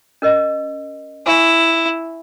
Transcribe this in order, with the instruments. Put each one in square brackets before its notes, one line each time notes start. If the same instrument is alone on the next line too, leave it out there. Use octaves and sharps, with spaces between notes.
[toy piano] C#4 A#4 D#5
[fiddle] E4 [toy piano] G#5 C#6